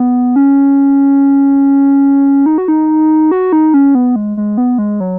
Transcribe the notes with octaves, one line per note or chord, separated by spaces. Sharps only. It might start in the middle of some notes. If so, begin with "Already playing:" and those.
Already playing: B3
C#4
D#4
F#4
D#4
F#4
D#4
C#4
B3
G#3
G#3
B3
G#3
F#3